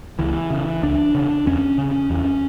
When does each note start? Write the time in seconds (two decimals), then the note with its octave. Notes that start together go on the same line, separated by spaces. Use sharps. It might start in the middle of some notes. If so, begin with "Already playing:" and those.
0.19 C#2 E3
0.51 C#3
0.83 C#2 D4
1.15 C#3
1.46 E2 C#4
1.78 C#3
2.10 E2